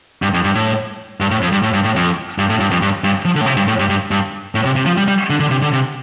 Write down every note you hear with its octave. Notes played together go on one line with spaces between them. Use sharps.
G2
F2
G2
A2
G2
A2
F2
G2
A2
G2
A2
F2
G2
A2
G2
F2
G2
G2
F3
D3
A2
C3
G2
A2
G2
G2
G2
A2
C3
C3
F3
G3
G3
D3
D3
C3
D3
C3